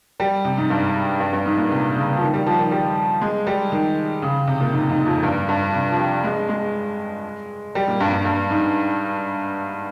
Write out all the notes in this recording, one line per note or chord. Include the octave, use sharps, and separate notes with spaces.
G3
C3
G#2
G2
G2
G2
G#2
A#2
C3
C#3
F3
D#3
G3
F3
D#3
G3
G#3
G3
D#3
C#3
C3
A#2
G#2
G#2
F2
G2
G2
C3
F3
G3
G#3
G#3
G3
A#2
G2
G2
G2
G#2